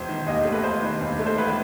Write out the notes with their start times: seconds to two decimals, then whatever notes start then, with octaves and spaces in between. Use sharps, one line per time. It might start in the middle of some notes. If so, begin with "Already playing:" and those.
Already playing: E1 C5
0.09 D#3
0.26 D#2 D#5
0.45 A3
0.52 B4
0.63 E1 C5
0.82 D#3
1.01 D#2
1.19 A3
1.26 C5
1.38 E1 B4